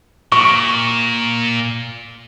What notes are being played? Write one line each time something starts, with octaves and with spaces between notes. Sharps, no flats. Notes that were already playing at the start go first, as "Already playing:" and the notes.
A#2 C#6